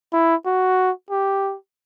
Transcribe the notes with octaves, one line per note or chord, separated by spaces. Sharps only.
E4
F#4
G4